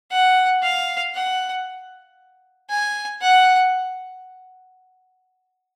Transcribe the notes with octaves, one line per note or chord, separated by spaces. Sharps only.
F#5
F5
F#5
G#5
F#5